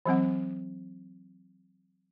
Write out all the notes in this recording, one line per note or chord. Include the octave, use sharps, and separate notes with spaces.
E3 F#3 C4 F#5